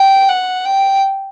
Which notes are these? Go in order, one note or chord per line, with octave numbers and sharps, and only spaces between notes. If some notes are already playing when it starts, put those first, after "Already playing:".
Already playing: G5
F#5
G5